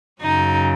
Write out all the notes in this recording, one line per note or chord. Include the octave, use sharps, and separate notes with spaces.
F#2 C#3 F#3 D#4